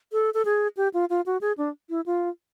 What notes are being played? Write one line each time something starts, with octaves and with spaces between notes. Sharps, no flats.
A4
A4
G#4
G4
F4
F4
F#4
G#4
D4
E4
F4